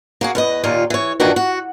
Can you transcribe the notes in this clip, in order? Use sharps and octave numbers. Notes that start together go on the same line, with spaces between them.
A#3 F#4 G#4
E2 B4 D#5
D#2 A#2 D#4 F4
E3 C#5
G2 A#2 D#3 E3 D4 F#4
F#4